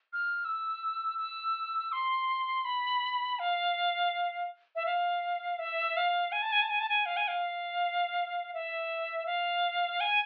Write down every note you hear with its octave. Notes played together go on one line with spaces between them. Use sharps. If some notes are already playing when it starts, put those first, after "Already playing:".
F6
E6
E6
C6
B5
F5
E5
F5
E5
F5
G#5
A5
G#5
A5
G#5
A5
G#5
F5
G#5
F5
E5
F5
G#5